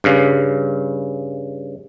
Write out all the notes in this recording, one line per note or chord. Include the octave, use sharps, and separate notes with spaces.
G2 C#3